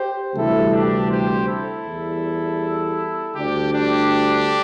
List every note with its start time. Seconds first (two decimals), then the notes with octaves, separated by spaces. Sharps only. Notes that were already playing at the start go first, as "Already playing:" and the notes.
Already playing: G4 C5
0.34 D2 C3 E3 G3 E4 A4
0.72 D4 G4
1.10 G4 C5
1.48 E4 A4
1.85 E2 E3 G3
3.35 D2 D3 G3 D4 G4
3.74 D4 G4